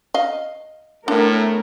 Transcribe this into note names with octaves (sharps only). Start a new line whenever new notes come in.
D#5 F5
A2 A3 B3 D4 A#4